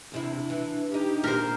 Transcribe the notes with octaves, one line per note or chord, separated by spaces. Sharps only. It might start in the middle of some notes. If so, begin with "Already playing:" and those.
E2 C3 D4 E4
E3
E2 D#4 G4
A#2 A#4 C5